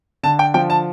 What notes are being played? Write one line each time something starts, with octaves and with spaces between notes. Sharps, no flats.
D3 A5
G5
F3 G5
A5